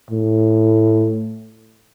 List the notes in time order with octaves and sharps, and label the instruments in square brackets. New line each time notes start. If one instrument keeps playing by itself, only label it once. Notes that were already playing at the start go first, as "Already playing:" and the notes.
[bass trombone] A2